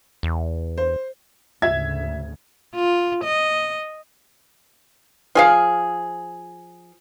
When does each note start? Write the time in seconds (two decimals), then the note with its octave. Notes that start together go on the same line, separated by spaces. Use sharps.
0.23 E2
0.78 C5
1.62 D2 G#2 C#3 E5 G#6
2.74 F4
3.24 D#5
5.35 F3 G#4 F5